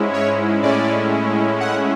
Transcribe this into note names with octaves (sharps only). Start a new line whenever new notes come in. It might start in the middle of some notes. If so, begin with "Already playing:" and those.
Already playing: G#2 G#3 C#4 E4
C#5
A2 G#3 C#4 E4 D5
F#5